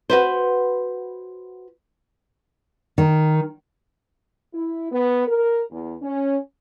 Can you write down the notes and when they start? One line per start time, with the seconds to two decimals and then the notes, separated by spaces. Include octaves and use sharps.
0.10 F#4 B4 C5
2.98 D#3
4.54 E4
4.92 B3
5.26 A#4
5.71 E2
6.02 C#4